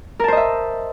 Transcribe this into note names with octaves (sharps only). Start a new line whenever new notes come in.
A#4 C5 D#5 E5 A5